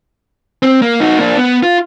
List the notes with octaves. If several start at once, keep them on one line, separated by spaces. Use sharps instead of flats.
C4
A#3
D#4 F#4
A#3 D4
B3
F4